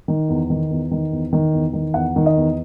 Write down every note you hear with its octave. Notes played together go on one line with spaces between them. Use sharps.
D#3
E2
D#3
E2
D#3
E2
D#3
E2
D#3
E2 F#5
D#3
D#5
E2